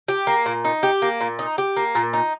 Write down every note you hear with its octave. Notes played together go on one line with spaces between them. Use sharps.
G4
A#3
A#2
D#4
G4
A#3
A#2
D#4
G4
A#3
A#2
D#4